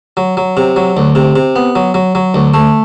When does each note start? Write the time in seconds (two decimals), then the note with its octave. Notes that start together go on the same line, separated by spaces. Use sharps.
0.17 F#3
0.37 F#3
0.57 C3
0.76 F#3
0.97 D2
1.15 C3
1.36 C3
1.56 B3
1.75 F#3
1.94 F#3
2.15 F#3
2.34 D2
2.54 A3